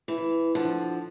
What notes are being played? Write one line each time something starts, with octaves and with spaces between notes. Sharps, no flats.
E3
D3 F3